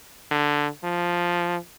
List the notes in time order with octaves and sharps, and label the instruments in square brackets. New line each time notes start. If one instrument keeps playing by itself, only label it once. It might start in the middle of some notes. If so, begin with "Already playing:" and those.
[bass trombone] D3
F3